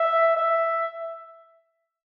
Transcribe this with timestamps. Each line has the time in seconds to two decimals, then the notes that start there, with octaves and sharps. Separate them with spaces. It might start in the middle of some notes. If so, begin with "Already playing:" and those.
Already playing: E5
0.37 E5